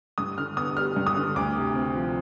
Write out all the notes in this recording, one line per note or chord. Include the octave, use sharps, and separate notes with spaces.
G2 D#6
D3 F6
B3 D#6
G3 F6
G2
D#6
D3
D2 D6
C3
C4
F3